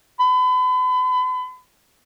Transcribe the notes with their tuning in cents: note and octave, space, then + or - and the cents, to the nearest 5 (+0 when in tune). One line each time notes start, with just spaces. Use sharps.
B5 +40